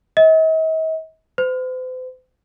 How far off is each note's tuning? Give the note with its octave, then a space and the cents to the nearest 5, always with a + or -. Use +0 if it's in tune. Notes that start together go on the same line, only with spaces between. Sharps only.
D#5 +45
C5 -45